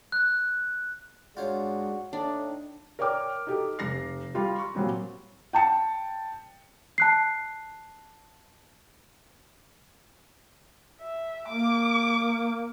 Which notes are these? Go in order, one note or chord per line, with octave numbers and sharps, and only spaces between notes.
F#6
G#2 G#3 D4 F4 F#4 C5 C#5
A2 D4 D#4
A#4 C#5 D5 G5 D6 F6
D#4 G4 A4
F1 A#6 C7
G3 F4 G4
C#6
A#2 F#3 G3 C4
G5 A5 C#7
A5 F#6 C7
E5
A#3 D6